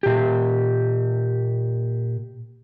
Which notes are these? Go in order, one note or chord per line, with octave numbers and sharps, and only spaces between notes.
A#2 G4